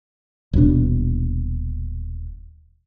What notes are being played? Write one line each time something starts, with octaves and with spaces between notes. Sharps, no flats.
D#1 E2 B2 D4